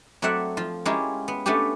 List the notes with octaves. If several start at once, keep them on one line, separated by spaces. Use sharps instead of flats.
F#3 A3 C4 D5 E5 F#5
F3 F4
G#3 C#4 E4 F4 G4 A#4
B3
A3 B3 C#4 D4 G4